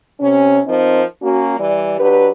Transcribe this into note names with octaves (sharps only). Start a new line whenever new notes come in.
C3 C#4
F3 C4 D#4 A#4 C5
A#3 C#4 F#4
E3 G3 D5
F#3 D4 G4 B4